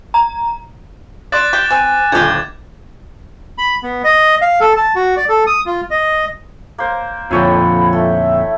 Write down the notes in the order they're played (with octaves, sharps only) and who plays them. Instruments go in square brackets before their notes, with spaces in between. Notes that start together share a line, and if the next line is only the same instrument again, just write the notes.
[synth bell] A#5
[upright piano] D5 C6 [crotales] D6 F#6 A6
[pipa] G4
[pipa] C4 [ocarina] G#5
[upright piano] D#1 D3 [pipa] F3 G4 [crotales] G#6
[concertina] B5
B3
D#5
F5
A4
A5
F#4
D5
A4
D#6
F4
D#5
[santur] A#3 C5
[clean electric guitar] F2 A#2 D3 [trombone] F3 [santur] E4 C#5 G5 [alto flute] B5
[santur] A3 [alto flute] E5